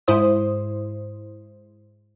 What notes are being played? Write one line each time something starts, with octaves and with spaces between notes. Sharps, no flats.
G#2 E4 C5 D#6